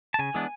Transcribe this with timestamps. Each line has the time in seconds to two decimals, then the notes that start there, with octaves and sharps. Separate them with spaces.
0.14 A5
0.19 C#3 G#5
0.34 E3 G#3 B3 D4